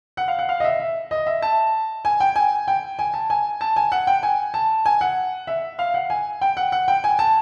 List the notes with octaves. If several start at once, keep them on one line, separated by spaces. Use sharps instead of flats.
F#5
F5
F#5
F5
D#5
E5
E5
D#5
E5
A5
G#5
G5
G#5
G5
G#5
A5
G#5
A5
G#5
F#5
G5
G#5
A5
G#5
F#5
E5
F5
F#5
G#5
G5
F#5
F#5
G5
G#5
A5